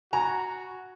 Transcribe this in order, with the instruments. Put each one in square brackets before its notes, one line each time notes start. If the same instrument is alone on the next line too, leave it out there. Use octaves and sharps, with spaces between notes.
[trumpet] F#4 [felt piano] G#5 [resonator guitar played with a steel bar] A#5